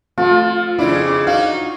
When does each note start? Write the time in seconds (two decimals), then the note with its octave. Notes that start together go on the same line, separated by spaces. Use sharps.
0.18 F3 A3 F4
0.79 F2 C#3 D4 E4
1.27 D#4 F#4 F5